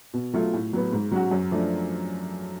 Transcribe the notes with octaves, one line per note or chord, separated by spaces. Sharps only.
B2
F#3 A3 F4
A2
F#3 B3
G#2
F#3 C#4 F#4
F#2
F3 A3 D4